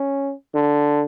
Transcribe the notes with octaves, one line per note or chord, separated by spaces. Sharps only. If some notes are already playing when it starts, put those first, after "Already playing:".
Already playing: C#4
D3